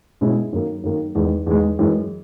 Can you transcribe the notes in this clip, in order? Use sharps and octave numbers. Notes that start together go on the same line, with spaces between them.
B2 G#3 C#4 E4
F#2 D#3 A#3
F#2 D#3 A#3
E2 D#3 G#3
E2 D#3 G#3
F#2 E3 G#3